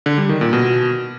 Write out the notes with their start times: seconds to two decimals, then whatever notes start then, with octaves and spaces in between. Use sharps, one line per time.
0.06 D3
0.18 G3
0.29 D#3
0.41 A#2
0.53 B2